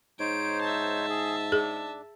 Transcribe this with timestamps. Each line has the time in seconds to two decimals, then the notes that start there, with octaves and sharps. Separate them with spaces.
0.20 G#2 D#4 C5 C#5 D7
0.62 E5 A5
1.10 G#4
1.52 D4 G#4